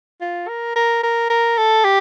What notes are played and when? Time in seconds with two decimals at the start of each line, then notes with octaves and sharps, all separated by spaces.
0.21 F4
0.48 A#4
0.76 A#4
1.03 A#4
1.30 A#4
1.58 A4
1.85 G4